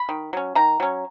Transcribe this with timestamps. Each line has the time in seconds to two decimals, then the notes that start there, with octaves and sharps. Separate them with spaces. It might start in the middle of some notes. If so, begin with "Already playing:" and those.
Already playing: B5
0.09 D#3
0.33 F#3 C#4
0.55 D#3 A#5
0.80 F#3 C#4